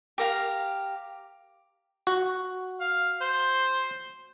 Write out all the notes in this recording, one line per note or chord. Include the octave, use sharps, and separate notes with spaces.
G4 A#4 F5
F#4
F5
C5